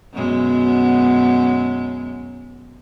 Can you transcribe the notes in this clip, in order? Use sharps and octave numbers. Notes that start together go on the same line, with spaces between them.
F#2 B2 G#3